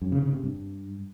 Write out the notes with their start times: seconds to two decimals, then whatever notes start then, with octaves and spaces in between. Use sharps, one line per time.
0.02 F#2
0.12 C#3
0.23 C#3
0.33 C3
0.44 G2